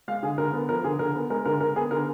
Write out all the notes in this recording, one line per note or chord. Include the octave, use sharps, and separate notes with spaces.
G#3 F5
D3 G#4
D3 A#4
B3
F3 A#4
D3 G#4
D3 A#4
B3
G#3 A#4
D3 A#4
D3 A#4
B3 G#4
D3 A#4